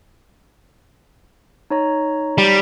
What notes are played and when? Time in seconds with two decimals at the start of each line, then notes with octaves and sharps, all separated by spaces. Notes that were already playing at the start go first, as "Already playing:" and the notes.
1.70 D#4 C#5 A#5
2.38 G3